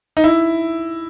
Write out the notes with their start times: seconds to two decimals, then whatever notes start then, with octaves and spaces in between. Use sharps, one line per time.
0.17 D#4
0.24 E4